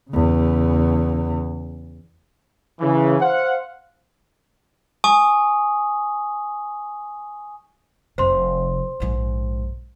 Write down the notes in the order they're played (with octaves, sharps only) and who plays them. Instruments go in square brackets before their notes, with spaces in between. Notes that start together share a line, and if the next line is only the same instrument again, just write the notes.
[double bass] E2 C#3
[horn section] C#3 E3
C5 F5 F#5
[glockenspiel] G#5 C#6 D#6
[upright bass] F1 C3 [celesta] C5 C6
[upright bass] A#1 G#2